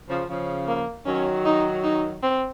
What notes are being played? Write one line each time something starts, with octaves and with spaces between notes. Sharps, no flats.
C#3 F3
C#3 F3
A#3
D#3 F#3 C#4
D#4
D#4
C4